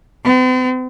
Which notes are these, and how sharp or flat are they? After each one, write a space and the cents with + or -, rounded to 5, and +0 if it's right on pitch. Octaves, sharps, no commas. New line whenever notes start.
C4 -45